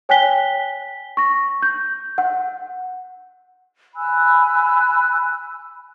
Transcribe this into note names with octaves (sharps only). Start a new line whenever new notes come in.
C#5 G5 G#5 F#6 B6 G7
C#6 A#6
G6
F#5
G#5 B5 E6 F#6